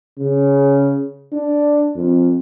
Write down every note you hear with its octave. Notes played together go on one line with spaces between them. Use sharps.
C#3
D4
F2